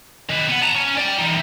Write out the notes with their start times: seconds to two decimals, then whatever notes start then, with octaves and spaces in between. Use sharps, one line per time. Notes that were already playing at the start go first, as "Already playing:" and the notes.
0.30 D#3 B4
0.49 B3 F#5
0.62 A5 A#5
0.75 C#4
0.97 D5 G5
1.18 E3 D#4